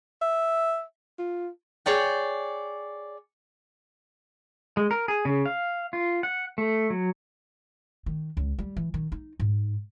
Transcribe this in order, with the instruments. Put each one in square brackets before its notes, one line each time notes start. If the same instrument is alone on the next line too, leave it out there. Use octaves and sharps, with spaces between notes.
[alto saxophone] E5
F4
[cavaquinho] G#4 C#5 D5 G5
[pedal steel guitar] G#3
A#4
G#4
C#3
F5
F4
F#5
A3
F#3
[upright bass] D#3
C#2
G3
E3
D#3
D#4
G#2